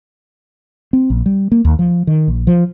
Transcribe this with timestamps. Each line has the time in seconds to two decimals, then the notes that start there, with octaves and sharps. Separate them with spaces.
0.93 C4
1.10 A#1
1.26 G3
1.52 A#3
1.65 D#2
1.79 F3
2.07 D#3
2.28 A#1
2.47 F3